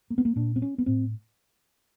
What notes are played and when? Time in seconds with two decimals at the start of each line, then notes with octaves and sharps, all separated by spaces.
0.10 A#3
0.18 B3
0.25 A#3
0.36 A#2 D4
0.56 C4
0.62 C#4
0.78 B3
0.86 A2 C4